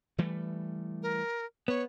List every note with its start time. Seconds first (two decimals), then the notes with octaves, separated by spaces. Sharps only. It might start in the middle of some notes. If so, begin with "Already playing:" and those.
0.18 E3 G3 A3
1.03 A#4
1.68 B3 C#5